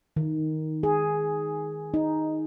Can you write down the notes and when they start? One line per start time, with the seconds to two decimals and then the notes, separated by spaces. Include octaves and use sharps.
0.16 D#3
0.83 G#4
1.94 D#4